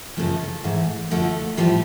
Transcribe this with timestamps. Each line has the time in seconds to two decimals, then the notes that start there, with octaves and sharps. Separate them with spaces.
0.17 F#2 C#3 F3 A3
0.64 G#2 E3
1.11 F#2 D3 F3 A3
1.57 A2 F3 G3